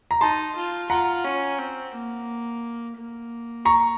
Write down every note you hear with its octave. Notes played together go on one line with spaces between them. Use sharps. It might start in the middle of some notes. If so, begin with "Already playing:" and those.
A#5
D#4 A5 C6
F4
F4 F#5 A#5
C#4
C4
A#3
A#3
A#5 C#6